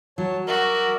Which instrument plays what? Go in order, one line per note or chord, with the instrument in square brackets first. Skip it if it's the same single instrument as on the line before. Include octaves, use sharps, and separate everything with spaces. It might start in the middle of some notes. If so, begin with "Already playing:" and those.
[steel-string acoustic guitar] F#3 [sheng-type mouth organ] C#5 A5
[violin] F#4 [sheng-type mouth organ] A#4 D5 E5